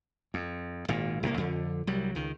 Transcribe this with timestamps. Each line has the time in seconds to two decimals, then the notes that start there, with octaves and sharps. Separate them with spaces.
0.34 F2
0.88 G#1 A#2
1.23 C2 A2 A#3
1.37 F2 D3
1.87 C2 F#3 G3
2.15 C#2 D#3